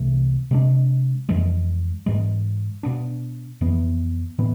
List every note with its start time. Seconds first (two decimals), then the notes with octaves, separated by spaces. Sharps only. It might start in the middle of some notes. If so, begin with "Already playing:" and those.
Already playing: C2 C3 E3 A3
0.51 C3 G#3 D4
1.29 F2 E3 G#3
2.06 G#2 E3 G#3
2.83 B2 B3 D4
3.61 F2 E3 B3
4.39 A2 E3 B3